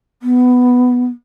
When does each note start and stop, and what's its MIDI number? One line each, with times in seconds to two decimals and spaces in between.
0.23 1.06 59